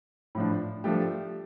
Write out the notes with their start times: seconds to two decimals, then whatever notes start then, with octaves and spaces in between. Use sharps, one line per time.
0.35 A2 F3 D4
0.84 F3 A3 D4 G4